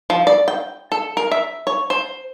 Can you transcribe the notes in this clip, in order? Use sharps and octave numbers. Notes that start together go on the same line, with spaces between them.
F3
D5
G5
A4
A#4
E5
C#5
C5